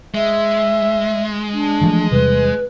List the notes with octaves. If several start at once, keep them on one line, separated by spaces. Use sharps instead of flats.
G#3 E5
D4
E3 F3 A3
E2 C3 G3 B4